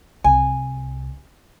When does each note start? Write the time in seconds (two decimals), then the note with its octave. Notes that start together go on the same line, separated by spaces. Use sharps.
0.24 C2 G#5